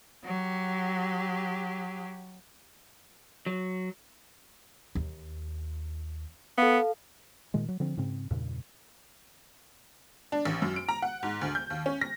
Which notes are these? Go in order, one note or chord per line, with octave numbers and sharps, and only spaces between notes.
F#3 G4
F#3
D#2
B3 A4 F5
A#2 D#3 G#3
F#3
D3 F3 C4
G#2 C#3 C4
E2 G2 A#2 C#3
D4
A1
F#2
D7
A#5
F#5
G#2
D2
G6
D#2
C#4
A#6